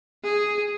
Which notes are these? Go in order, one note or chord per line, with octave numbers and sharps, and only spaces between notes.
G#4